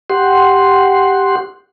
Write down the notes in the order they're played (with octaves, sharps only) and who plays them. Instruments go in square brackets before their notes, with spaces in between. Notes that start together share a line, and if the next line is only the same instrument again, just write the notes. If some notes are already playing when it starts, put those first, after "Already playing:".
[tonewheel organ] G4 F#5 C6